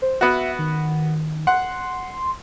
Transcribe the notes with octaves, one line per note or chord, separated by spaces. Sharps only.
C5
B3 F#4 E5
D#3
F#5 C6